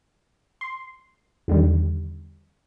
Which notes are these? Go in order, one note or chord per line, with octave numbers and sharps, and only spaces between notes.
C6
E2 D3 D#3 G3